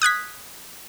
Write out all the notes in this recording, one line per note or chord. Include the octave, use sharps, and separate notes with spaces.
D#6 F#6 G#6 B6